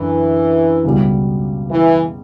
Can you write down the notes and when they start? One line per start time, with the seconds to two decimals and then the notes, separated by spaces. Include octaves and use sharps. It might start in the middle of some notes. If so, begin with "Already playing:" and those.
Already playing: F#2 D3 E3
0.84 C#2 B2 G3
1.71 E3